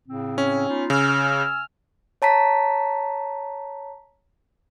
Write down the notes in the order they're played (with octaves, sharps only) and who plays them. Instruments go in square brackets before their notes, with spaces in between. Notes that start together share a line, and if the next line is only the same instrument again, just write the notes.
[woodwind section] A2 C#3 C4
[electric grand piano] C#4
[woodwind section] B3 D#4 F4
[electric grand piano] C#3 [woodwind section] G#5 E6 F6
[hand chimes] C#5 A5 A#5 B6